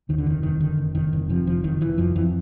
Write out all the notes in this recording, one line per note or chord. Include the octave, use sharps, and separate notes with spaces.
D#2 D#3
D3
F1 D#3
F1 D#3
D3 D#3
F1
F1 D#3
F1
C3 F3
F1 F3
F1 D#3
F1 E3
F2 F3
F2 E3